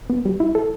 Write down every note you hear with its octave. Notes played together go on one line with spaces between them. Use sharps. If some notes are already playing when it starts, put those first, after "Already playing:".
B3
G3
E4
A4